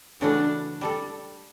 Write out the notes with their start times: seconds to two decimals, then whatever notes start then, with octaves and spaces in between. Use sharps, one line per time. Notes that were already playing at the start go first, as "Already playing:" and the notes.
0.21 C#3 E3 A3 C#4 D4 F#4
0.81 G3 D4 A4